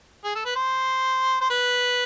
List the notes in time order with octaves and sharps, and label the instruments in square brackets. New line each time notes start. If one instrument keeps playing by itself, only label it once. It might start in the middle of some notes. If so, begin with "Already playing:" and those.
[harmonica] G#4
A4
B4
C5
C5
B4